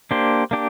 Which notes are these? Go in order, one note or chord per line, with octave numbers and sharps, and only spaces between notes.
A#3 D4 G4 C5
A#3 D4 G4